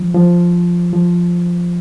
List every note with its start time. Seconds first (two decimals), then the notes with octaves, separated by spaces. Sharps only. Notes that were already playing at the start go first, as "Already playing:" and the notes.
Already playing: F3
0.14 F3
0.93 F3